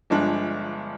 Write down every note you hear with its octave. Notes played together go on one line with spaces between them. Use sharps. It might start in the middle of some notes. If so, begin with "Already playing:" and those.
G1 G2 F3 G#3 D4